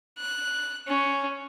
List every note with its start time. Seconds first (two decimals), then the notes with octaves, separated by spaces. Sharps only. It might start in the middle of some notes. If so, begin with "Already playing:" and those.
0.19 F#6
0.88 C#4